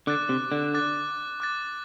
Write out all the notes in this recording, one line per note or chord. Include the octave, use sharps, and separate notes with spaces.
D3 D6 F#6 A6
C3
D3
D6 F#6 A6
D6 F#6 A6